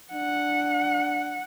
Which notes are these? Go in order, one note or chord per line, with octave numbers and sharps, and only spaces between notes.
D4 F#5